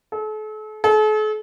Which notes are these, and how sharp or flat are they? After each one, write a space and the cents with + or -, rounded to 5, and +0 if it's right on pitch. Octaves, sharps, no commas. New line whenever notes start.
A4 -40
A4 -45